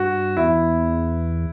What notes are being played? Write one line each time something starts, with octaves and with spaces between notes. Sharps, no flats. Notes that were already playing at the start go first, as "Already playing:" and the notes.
Already playing: G2 F#4
E2 E4